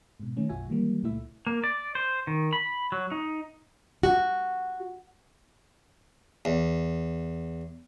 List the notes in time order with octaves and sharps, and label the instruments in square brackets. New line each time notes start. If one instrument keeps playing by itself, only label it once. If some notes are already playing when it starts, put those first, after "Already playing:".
[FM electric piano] G#2 B2
D#3 A3 C#4
B1 F#2 F4 F#4 E5 G#5
D#3 E3 F#3 G3 A#3
C#2 A#2 A3 E4 E5
[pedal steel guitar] A#3
D5
C5
D#3
B5
F#3
D#4
[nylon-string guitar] F#4
[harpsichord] E2